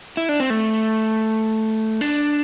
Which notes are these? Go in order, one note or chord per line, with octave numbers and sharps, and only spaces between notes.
E4
D4
C4
A3
D4